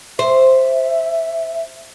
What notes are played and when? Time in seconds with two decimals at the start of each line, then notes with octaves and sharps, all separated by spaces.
0.19 C5 E5